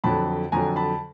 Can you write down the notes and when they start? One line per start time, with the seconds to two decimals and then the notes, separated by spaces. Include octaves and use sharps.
0.04 F2 D3 F#3 A5 B5
0.52 F2 D3 F#3 G#5 A#5
0.76 A5 B5